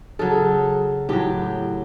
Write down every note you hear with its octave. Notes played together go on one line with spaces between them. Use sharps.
C#3 F#3 A4
A2 F#3 G4